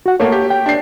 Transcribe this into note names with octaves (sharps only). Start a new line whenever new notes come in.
F#4 F#5
A3 A#3 A4 C#5
G4
G5
D4 C7